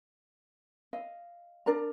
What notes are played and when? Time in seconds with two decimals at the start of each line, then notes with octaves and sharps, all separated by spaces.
0.93 D#5 F5
1.66 D4 A#4 D5 A#5